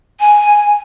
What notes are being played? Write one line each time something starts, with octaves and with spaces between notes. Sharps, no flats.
G#5